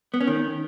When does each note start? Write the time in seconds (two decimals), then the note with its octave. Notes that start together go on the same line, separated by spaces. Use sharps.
0.14 B3
0.21 C#4
0.27 D#3